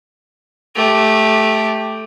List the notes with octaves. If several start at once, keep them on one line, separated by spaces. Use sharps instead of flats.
A3 G4